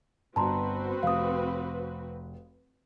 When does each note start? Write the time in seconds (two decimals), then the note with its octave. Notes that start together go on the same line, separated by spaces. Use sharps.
0.36 G1 C4 F#4 B4 A5 A#5 C6
1.03 F1 F5 D#6